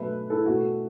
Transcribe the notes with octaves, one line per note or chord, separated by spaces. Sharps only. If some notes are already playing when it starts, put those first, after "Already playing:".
Already playing: B2 F#3 A3 B4 E5
E4 A4
B2 A3 F#4